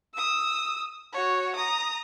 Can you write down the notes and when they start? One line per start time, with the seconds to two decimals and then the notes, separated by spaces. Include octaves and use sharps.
0.14 D#6 E6
1.13 F#4 C#5
1.55 A#5 D#6